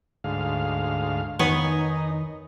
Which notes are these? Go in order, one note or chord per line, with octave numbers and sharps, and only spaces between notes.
D2 G#2 F5
F2 D#3 B3 D#4 C#5 G#5 B6